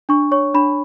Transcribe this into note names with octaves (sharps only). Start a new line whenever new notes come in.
D4 C#6
C#5 C#6
D4 B5